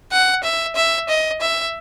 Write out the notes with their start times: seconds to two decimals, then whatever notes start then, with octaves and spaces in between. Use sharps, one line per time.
0.12 F#5
0.44 E5
0.76 E5
1.09 D#5
1.41 E5